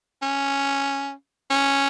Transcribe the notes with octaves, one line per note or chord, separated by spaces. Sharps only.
C#4
C#4